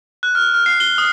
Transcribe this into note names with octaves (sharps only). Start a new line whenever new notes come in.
F#6
F6
F6
C7
G7
D#6